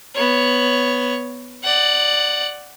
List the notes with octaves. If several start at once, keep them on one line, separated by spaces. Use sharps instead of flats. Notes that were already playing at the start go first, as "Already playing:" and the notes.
B3 C#5
D5 F#5